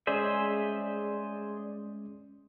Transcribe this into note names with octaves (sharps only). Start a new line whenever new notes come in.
G#3 C#4 G#4 C5 D5 E5